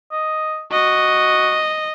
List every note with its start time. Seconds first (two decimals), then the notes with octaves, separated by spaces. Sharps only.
0.12 D#5
0.72 F#4 D#5